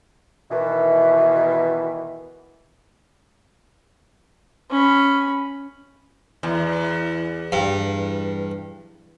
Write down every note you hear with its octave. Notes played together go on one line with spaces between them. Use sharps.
B2 D#3 E3
C#4 B5
E2
G2